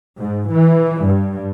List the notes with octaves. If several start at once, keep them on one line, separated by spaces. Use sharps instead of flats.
G#2
E3
G2